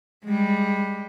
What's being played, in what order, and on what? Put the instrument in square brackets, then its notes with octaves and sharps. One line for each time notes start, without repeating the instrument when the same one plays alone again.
[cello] G3 G#3